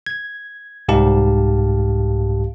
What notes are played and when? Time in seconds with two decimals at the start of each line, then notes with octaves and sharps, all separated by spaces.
0.06 G#6
0.88 C2 G#2 G4 F5 A5